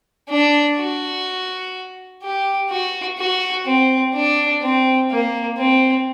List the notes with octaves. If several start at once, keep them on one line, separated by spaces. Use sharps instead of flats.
D4
F#4
G4
F#4
F#4
C4
D4
C4
A#3
C4